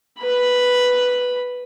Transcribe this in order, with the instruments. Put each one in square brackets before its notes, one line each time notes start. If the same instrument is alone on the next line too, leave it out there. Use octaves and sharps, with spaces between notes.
[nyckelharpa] B4 B5